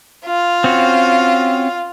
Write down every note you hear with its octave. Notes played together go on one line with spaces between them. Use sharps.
F4
C4 C#4 F#4